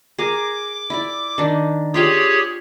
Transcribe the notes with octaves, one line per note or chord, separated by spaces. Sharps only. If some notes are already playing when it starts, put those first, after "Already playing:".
G#4 A#4 D6
E4 D5
D#3 D4
F4 G4 G#4 C#5 F5 G5